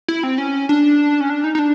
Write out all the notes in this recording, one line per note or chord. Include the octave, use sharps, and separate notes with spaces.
E4
C4
C#4
D4
C#4
D4
D#4
D#4
D4